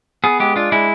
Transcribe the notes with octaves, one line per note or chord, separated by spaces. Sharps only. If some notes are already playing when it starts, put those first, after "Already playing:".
B3 G#4
G#3 G4
D4 F4
G#3 E4